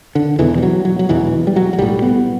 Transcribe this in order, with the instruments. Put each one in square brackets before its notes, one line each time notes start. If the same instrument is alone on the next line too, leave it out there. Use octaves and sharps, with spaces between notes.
[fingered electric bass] D3
E1 E2 B2 E3
G3
F#3
F#3
F#3
E1 E2 B2 E3
G3
F#3
F#3
B1 A2 G3
B3